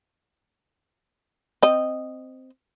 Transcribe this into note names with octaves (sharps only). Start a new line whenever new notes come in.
C4 D#5